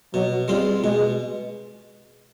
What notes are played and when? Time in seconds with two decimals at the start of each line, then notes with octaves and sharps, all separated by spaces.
0.14 B2 F#3
0.48 G3 G#3 C4 F4
0.83 B2 G#3